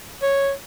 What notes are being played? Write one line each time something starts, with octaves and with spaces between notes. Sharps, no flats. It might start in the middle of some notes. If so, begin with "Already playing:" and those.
C#5